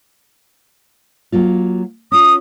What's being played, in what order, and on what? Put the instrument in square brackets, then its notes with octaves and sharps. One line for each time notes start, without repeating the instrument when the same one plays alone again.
[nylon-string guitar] F#3 A#3 F4
[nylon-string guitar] C#4 F4 [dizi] D#6